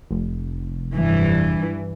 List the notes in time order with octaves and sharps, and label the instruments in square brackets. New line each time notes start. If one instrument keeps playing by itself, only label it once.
[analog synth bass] F1
[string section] G2 E3